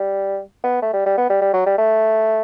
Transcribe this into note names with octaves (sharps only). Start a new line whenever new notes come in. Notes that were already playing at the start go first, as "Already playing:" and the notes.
Already playing: G3
B3
A3
G3
G3
B3
G3
G3
F#3
G3
A3